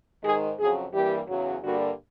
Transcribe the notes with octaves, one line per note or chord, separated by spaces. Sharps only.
G#2 D#3 G#3 G#4
F2 C#3 F#3 G#4
G2 E3 G3 A#3 G4
E2 C#3 F#3
G2 D3 G3 A#3 F#4